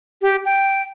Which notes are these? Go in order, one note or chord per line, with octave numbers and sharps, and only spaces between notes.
G4
G5